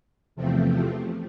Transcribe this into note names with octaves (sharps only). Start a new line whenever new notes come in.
E2 C3 F3 A3 C4